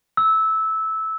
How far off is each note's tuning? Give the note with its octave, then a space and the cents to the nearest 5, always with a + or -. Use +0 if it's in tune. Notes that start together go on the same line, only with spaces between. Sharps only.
E6 -15